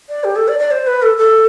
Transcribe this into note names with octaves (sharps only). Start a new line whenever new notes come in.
D5
G4
A4
D5
D5
C5
B4
A4
A4